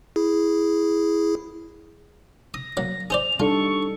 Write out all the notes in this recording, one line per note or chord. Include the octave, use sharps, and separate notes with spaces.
E4 G#4
D#6 A#6
F#3 A#3
G#4 C5 D5 F7
G3 D4 D#4 F4 A4 C#6